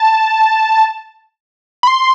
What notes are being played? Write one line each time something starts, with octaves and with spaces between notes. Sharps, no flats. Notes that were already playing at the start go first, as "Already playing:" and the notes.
Already playing: A5
B5
C6